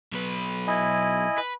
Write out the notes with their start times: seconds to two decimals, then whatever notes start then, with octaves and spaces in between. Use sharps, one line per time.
0.13 B1 B4
0.67 E4 D#5 G#5
1.38 B4